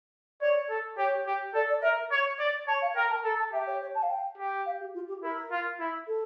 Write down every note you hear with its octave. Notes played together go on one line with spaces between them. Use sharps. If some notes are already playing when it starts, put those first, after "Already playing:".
C#5 D5
A4
G4 C#5
G4
A4 D5
D5
A#4 E5
C#5
D5
C#5 A5
F5
A#4 G5
A5
A4 A#5
A5
G4 E5
C#5
C#5
A5
F5
G5
G4
F5
G4
F4
G4
E4 A#4
F4
E4
A4